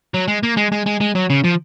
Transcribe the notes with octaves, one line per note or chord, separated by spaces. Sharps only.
F#3
G#3
A#3
G#3
G#3
G#3
G#3
F#3
C#3
F3